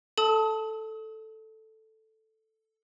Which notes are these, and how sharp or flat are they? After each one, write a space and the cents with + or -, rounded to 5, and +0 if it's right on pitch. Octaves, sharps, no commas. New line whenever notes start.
A4 +0 A5 +0 D#6 +40